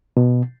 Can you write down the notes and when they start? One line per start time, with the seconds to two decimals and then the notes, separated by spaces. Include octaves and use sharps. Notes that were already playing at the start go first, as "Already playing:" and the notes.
0.17 B2